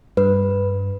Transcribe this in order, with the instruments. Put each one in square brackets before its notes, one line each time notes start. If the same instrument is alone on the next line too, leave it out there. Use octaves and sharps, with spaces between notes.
[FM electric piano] G2 [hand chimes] B4